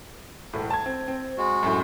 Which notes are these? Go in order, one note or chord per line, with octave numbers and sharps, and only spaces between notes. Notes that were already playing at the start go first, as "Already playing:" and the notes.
E1 A2
A5 G#6
C4
C4
G#3 F#4
F#2 A2